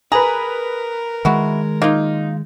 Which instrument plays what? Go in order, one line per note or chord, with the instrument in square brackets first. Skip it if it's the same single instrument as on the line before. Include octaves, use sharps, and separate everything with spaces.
[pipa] G#4 [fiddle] A#4 [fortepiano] B4 A#5
[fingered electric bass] D#3 G#3 [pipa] E4 F#4
[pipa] A#3 F4 [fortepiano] D#4